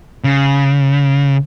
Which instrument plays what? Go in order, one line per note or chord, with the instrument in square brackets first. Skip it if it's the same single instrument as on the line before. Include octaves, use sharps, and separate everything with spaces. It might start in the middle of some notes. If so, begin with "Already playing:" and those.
[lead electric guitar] C#3